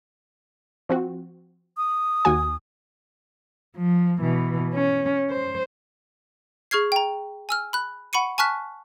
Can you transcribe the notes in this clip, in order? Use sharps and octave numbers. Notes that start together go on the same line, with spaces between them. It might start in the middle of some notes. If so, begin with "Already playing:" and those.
F3 C4 F#4
D#6
D#2 F#4 G#5
F3
B2 E3
C#4
C5
G#4 C#6 F6 G#6 C7
G5 A#5
G#5 E6 F6
B5 F#6
F#5 B5 C#6 C#7 D#7
G#5 A5 C#6 F6 F#6 B6